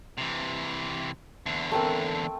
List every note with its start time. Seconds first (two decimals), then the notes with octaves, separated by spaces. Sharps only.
0.18 C3 E3
1.46 E2 D3
1.72 A3 C4 A#4